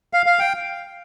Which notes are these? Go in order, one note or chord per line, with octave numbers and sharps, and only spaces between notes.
F5
F5
G5